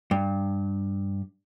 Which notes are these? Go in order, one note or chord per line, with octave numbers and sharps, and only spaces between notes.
G2